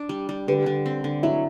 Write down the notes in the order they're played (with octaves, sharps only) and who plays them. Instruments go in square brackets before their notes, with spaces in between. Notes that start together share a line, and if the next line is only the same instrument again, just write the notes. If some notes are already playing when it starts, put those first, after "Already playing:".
Already playing: [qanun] D4
G3
G3
[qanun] D3 [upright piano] G4 B4
[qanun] D3
C4
D3
[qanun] F#3 [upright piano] E4